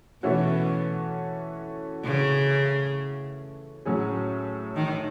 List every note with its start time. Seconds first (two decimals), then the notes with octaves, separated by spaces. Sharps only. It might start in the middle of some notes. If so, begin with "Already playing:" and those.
0.23 B2 E3 A3 C#4 F#4 A4
2.04 C#3
3.85 A2 F#3 C#4 G#4
4.76 D#3